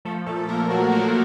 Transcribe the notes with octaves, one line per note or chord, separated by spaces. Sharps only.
F3 A3 A4
A#2 A3 A4
A#2 A#3 A#4
F3 F#3 F#4
F3 A#3 A#4